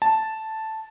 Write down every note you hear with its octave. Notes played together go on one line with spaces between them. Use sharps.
A5